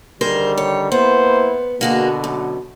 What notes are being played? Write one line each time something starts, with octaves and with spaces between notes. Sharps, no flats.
D3 D#3 G3 G#4 A#4 C5
C#5
A#3 B3 E4 C5
B2 D3 A#3 F#4 G#4
F#2